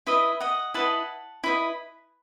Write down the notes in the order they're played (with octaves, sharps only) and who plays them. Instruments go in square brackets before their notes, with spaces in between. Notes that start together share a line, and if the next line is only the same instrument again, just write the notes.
[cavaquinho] E4 B4 D#5 E5
D#5 F#5
E4 B4 D#5 F#5 A5
E4 B4 D#5